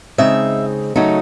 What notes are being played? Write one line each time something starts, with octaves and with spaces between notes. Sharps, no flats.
C#3 G#3 C4 D#4 E5
C#3 F#3 A3 D#4